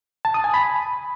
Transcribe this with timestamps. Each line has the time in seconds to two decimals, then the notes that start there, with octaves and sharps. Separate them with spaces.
0.25 A5
0.34 D#6
0.44 G#5
0.54 B5